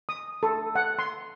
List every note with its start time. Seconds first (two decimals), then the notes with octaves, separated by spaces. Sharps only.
0.09 D#6
0.43 A4
0.75 F#5
0.99 C6